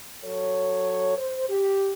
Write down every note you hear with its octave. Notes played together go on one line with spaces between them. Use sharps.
F#3 A4 C#5
C5
G4